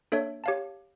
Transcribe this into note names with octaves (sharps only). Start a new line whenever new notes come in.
A#3 D4 A4 C#5 E5
G4 C#5 F5 A5